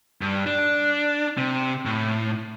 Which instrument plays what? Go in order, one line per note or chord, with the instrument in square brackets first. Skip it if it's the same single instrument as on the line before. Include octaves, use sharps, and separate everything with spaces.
[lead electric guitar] G2
D4
C3
A2